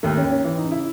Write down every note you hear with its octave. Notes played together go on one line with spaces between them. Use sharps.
D#2 A3
C#4
D#2
C#4
E3
D#4
C#3
E4